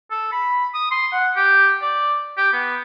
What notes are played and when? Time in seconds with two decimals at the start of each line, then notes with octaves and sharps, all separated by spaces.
0.11 A4
0.32 B5
0.74 D#6
0.91 C6
1.12 F#5
1.36 G4
1.82 D5
2.37 G4
2.53 B3